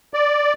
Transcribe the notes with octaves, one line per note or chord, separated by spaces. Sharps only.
D5